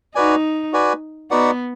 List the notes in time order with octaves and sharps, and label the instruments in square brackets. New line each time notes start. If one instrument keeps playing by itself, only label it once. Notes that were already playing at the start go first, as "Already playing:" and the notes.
[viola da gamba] D#4 [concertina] F#4 B4 D5 G#5
[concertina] F#4 B4 D5 G#5
[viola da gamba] B3 [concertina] D#4 F#4 B4 D5 F#5